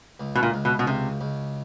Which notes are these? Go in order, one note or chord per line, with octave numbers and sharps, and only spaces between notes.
C#2
B2
A#2
C#2
B2
B2
C#2 C3
C#2